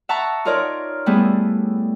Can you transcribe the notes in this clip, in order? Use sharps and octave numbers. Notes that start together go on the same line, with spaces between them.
E5 F#5 A5 A#5 C#6
D#4 F4 A#4 C#5 D5
G3 A3 B3 E4 G#4